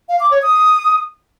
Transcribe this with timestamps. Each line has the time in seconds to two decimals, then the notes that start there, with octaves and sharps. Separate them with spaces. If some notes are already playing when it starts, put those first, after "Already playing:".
0.09 F5
0.20 D6
0.31 C#5
0.42 D#6